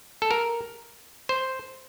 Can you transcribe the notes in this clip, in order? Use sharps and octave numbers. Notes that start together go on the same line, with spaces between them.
A4
A#4
C5